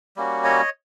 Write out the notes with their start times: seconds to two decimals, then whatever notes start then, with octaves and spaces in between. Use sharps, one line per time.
0.16 G3 A#3 C#4 F#4
0.44 C#5 D#5